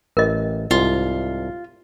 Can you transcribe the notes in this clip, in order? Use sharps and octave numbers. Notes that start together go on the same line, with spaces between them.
A1 A#4 D#5
C2 G#2 F4